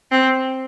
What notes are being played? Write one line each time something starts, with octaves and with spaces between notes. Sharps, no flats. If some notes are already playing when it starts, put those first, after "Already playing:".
C4